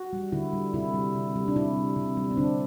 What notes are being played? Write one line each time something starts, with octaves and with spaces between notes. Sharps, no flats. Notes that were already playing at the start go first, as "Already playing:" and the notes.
Already playing: F#4
G3
D3 E4
G3
C3 E4
G3
C3
G3
D4
C3 E4
G3
C3
G3
C4
D3 D4